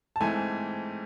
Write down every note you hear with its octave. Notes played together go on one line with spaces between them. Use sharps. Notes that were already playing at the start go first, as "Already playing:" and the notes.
A5
G#2 E3 A3 C4 G#5